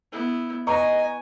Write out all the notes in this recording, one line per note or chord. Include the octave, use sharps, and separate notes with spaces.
B3 E4
B4 D#5 G#5 A#5 C#6